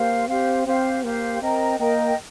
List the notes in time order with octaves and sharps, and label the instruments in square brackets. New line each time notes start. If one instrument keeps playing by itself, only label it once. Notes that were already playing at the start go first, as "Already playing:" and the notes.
Already playing: [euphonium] A#3 [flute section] G4 C5 F5
[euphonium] C4 [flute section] G4 C5 F5
[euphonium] C4 [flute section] G4 C5 F5
[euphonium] A#3 [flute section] G4 C5 F5
[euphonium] C4 [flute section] A#4 D#5 G5 A#5
[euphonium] A#3 [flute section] A#4 D#5 G5 A#5